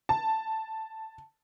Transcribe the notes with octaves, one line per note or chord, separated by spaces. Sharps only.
A5